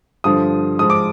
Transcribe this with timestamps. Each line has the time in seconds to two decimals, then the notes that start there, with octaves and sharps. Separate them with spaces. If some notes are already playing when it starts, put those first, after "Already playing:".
0.24 G2 D3 F3 D#6
0.79 G#2 F3 D#6
0.90 D6